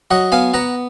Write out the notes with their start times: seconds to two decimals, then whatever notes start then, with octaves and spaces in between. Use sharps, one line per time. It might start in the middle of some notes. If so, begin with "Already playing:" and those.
0.11 F#3 D#5 F#5
0.32 B3 F5 G#5
0.54 B3 F#5 A#5